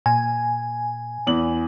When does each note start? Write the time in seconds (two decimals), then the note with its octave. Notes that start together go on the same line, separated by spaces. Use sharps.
0.06 A#2 G#5
1.27 E2 F#7